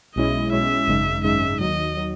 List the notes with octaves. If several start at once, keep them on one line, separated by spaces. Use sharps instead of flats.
B1 B2 G#3 C#4 E4 D#5
B1 B2 G#3 C#4 E4 E5
G#1 F#2 C#3 G#3 D#4
G#1 F#2 C#3 G#3 D#4 E5
D#2 D#3 F#3 D#5
D#3 F#3